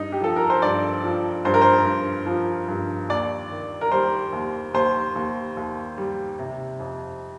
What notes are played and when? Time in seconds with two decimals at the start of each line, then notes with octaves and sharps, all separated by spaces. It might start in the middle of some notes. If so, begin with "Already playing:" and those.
Already playing: G2 D#4
0.12 G4
0.21 F3 A4
0.36 A#4
0.50 C5
0.62 G2 D5
1.04 F3
1.45 G2 C5
1.54 A#4
1.62 C5
1.85 G2
2.26 F3
2.68 G2
3.09 D#2 D5
3.51 D#3
3.81 A#4
3.92 G3 C5
4.33 D#2
4.74 D#2 C5
5.16 D#2
5.57 D#2
5.98 G3
6.39 C3
6.79 F2